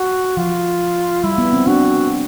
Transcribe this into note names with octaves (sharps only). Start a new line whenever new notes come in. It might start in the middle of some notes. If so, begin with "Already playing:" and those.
Already playing: F#4
F3 F4
G3 E4
B3
C4
D4 F#4